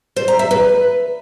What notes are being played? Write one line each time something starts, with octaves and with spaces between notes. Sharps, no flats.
C5
A#5
E5
B4